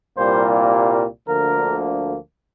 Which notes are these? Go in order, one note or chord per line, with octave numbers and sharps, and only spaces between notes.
C2 A#2 G3 A#3 C5
D2 D3 F3 A#3 A#4